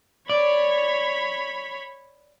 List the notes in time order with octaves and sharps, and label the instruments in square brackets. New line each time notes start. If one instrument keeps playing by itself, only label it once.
[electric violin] C#5 B5 [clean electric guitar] D5